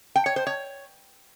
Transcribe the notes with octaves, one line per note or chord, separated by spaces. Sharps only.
G5
C#5
C5
C#5